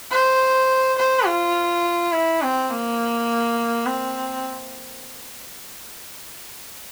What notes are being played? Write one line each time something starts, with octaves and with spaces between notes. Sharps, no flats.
C5
C5
F4
E4
C4
A#3
C4